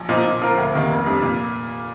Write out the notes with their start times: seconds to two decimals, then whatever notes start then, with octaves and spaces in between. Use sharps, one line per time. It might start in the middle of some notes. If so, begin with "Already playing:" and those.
Already playing: A#1
0.09 A#2 F3 C4 D#4
0.25 A#2
0.42 F3 C4 F4 A#4
0.58 D2
0.74 C3 D#3 A#3
0.90 F1
1.06 F2 C3 G3 D4
1.22 A#2